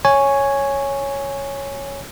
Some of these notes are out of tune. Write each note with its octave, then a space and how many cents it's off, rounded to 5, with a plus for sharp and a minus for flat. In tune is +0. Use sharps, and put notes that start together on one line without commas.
C#5 +0 G#5 +0